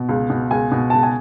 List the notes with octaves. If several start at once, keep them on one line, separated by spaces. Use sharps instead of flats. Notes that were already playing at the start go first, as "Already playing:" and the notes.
Already playing: B2
C#2
B2
C#2 G#5
B2
C#2 A5
G#5